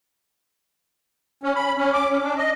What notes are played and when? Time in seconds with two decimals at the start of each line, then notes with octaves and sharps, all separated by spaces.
1.44 C#4
1.55 B5
1.77 C#4
1.93 D6
2.10 C#4
2.22 D4
2.37 D#5